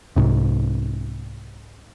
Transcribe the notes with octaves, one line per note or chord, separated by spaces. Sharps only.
C2 G#2 C3